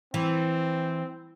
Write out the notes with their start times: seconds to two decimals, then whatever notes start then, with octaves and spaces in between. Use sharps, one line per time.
0.14 E3 C4